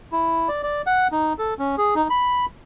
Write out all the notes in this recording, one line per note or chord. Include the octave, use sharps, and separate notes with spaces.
E4
D5
D5
F#5
D#4
A4
C#4
G#4
D#4
B5